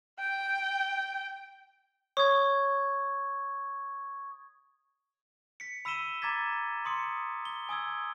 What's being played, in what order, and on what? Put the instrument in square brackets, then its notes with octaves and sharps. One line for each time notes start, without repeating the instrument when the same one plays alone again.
[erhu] G5
[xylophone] C#5 [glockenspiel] C#6 D#6 G#6
[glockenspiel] B6 C#7
B5 E6 B6 D#7 E7 G7
A#5 D6 G#6 A6 B6
B5 C6 D#6 C#7
G7
G#5 D#6 E6 G#6